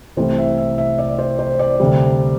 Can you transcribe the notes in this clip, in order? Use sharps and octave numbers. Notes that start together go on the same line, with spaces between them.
C2 C3 E3 A3 C5
E5
E5
E5
D5
C5
C5
D5
D2 C3 G3